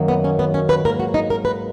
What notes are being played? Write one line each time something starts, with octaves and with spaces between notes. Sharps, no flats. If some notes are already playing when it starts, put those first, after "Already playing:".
Already playing: F#2 D#3 F#3 A#3
B3
C#4
B3
C#4
B4
G#2 F#3 A#3 A#4
F#4
D#4
A#4
B4